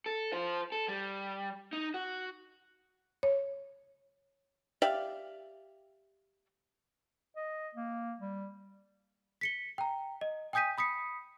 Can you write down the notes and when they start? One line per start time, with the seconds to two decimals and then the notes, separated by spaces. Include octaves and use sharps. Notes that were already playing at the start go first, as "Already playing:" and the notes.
0.06 A4
0.32 F4 C5
0.72 A4
0.88 G3
1.73 D#4
1.94 F#4
3.23 C#5
4.82 G4 D5 E5 F5
7.36 D#5
7.75 A#3
8.19 G3
9.41 B6 C#7 G7
9.78 G5 A#5
10.21 D#5
10.53 G5 G#5 D#6 G6 B6 D#7
10.78 B5 D#6 B6 C#7